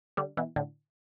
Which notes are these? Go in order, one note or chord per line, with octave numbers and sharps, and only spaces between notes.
D3 G3
B2 E3
A2 D3